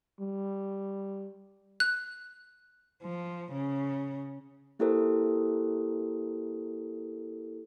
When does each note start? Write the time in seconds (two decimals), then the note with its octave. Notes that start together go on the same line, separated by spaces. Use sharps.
0.20 G3
1.80 F#6
3.03 F3
3.53 C#3
4.79 A#3 E4 G4 A4 A#4 C5